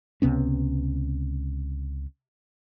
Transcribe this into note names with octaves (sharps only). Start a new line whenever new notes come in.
C#2 C3 B3 C#4